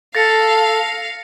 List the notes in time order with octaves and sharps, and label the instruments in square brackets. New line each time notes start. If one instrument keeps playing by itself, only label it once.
[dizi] A4 [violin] F5 [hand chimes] A6 [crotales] A#6 C#7